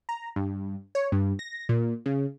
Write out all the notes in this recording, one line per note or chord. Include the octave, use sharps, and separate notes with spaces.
A#5
G2
C#5
G2
A#6
A#2
C#3